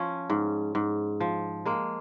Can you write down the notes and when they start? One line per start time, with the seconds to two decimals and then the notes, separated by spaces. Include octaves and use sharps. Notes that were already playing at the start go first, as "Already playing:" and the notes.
Already playing: F3 C#4
0.30 G#2
0.75 G#2
1.20 F3
1.65 G#3 A#3